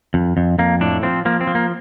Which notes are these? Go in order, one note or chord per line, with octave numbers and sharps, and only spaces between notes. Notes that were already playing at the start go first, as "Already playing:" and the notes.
F2
F2
F2 A#3
A2 D4
F3 C4
F3 A#3
C4
F3
A#3